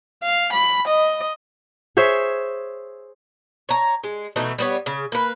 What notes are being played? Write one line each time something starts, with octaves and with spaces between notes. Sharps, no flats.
F5
B5
D#5
G#4 C5 C#5 E5
C#5 A#5
G#3
B2 E3 A3 D#4
G3 B3 C#5
C#3
A#3 B4